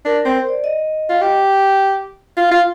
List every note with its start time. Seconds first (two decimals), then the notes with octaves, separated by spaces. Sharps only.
0.05 D4 A#4
0.20 A#4
0.25 C4
0.34 C5
0.49 D5
0.64 D#5
1.09 F4
1.21 G4
2.37 F4
2.51 F4